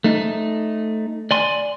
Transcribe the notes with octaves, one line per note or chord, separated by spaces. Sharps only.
A3 D#4
D5 G#5 C6